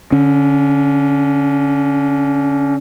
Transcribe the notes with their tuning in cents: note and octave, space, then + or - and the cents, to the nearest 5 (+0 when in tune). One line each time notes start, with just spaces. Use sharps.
D3 -20 C#4 +5